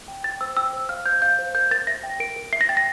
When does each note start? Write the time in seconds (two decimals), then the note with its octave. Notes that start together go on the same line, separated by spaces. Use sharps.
0.08 G5
0.24 G5 A6
0.41 C5 E6
0.57 G5 E6
0.73 C5
0.89 F5 F6
1.06 C5 G6
1.22 F5 G6
1.39 C5
1.55 A#4 G6
1.71 A#4 A6
1.87 E5 A#6
2.03 G5
2.20 A#4 D7
2.36 A#4
2.52 E5 C7
2.61 A#6
2.69 G5 A6
2.77 A#6